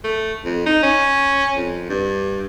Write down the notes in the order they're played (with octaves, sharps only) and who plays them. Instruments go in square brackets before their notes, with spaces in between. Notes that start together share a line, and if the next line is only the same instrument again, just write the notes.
[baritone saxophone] A3
F2
D#4
C#4
F2
G2